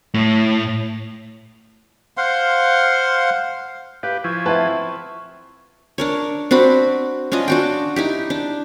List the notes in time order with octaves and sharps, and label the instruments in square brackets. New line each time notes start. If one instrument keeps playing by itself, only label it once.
[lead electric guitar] A2
[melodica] C5 F5 F#5 C6
[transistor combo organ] G4 B4 [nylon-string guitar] F5
[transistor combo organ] F3 E4 G#5 [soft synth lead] C#6
[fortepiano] C4 B4 A5 [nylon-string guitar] E5 F#5
[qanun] D4 A#4 C#5
C4 D4 F#4 B5
C#4 D4 F4 D#5
D4 F#4 G5
D#4 E4 G4
D4